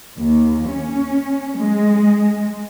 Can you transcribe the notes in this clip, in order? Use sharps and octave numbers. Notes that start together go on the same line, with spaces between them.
D#2
C#4
G#3